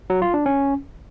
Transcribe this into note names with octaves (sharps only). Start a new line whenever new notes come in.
F#3
F4
D4
C#4